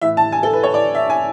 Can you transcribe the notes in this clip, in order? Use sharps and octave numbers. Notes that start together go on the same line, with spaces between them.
A2 E3 E5
A5
G#5
A4
B4
C#5
D5
E5
G#5